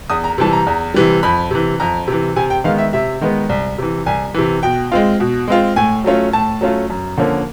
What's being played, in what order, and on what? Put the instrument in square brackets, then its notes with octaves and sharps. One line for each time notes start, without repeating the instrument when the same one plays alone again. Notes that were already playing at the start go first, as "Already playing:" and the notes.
[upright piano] E2 D#6
A#5
C3 E3 G3 A5
A#5
E2
C3 E3 G3
F2 B5
C3 E3
F2 A#5
C3 E3
C3 G#5
G5
D#3 G#3 B3 F5
E5
C3 E5
D#3 G#3 B3
C2
C3 E3
C2 G#5
C3 E3
B2 G5
G#3 C4 F4
B2
G#3 C4 F4
A2 G#5
F#3 A3 C#4 F4
A2 A5
F#3 A3 C#4 F4
F#2
D3 F3 A#3 C#4